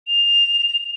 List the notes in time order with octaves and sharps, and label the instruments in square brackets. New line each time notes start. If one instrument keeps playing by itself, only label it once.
[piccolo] F7